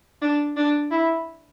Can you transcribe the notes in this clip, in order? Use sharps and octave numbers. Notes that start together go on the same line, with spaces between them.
D4
D4
E4